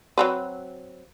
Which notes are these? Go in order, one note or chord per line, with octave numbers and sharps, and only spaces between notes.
F#3 C4 B4